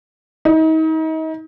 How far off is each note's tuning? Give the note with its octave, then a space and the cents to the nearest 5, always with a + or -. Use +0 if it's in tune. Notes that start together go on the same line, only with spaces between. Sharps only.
D#4 +35